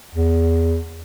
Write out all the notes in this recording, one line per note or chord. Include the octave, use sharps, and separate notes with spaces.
E2